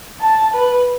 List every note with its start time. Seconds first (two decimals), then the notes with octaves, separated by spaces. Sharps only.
0.21 A5
0.54 B4